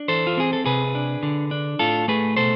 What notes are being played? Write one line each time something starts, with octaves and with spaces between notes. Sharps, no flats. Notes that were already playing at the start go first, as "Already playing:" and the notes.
Already playing: D4
E3 A4 C5
F4
C4 G#4
A4
C3 G#4 B4
D4
D3
D4
A2 F4 A4
A3 G#4 B4
B2 A4 C5